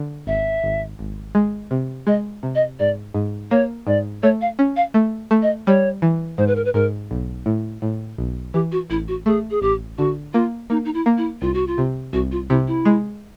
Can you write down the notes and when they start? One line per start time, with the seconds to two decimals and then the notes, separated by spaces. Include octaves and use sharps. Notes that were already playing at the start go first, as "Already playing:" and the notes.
Already playing: D3
0.27 G#1 E5
0.63 G#1
0.99 G#1
1.35 G#3
1.71 C3
2.07 G#3 D#5
2.43 C3
2.55 D#5
2.79 G#2 D5
3.14 G#2
3.51 A#3 C#5
3.87 G#2 D5
4.23 A3 C#5
4.41 F5
4.59 C#4
4.76 F5
4.94 A3
5.31 A3
5.42 D#5
5.67 G3 C#5
6.02 E3
6.38 G#2 C5
6.47 B4
6.56 A#4
6.65 B4
6.74 G#2 A#4
7.11 B1
7.46 A2
7.82 A2
8.18 B1
8.54 E3 G4
8.72 F#4
8.90 A1 E4
9.08 F#4
9.26 A3 G#4
9.51 G#4
9.62 A1 G4
9.98 D3 F#4
10.33 A#3 F4
10.70 A#3 D#4
10.85 D#4
10.94 E4
11.06 A#3
11.17 E4
11.42 C2 F4
11.54 F#4
11.67 F4
11.78 C3
12.13 C2 F#4
12.32 F4
12.50 C3 E4
12.67 E4
12.85 G#3